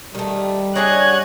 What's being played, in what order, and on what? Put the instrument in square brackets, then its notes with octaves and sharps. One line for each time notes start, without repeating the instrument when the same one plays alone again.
[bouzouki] D#3 A3 [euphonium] G3
[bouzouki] D4 G#4 F#5 [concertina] C#5 D#5 [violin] F#6 G#6